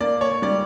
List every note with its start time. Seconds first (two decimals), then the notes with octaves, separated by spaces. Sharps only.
0.01 A#3 D5
0.21 C#5
0.42 G3 D5